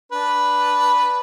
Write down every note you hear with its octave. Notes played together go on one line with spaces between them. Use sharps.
D4 B4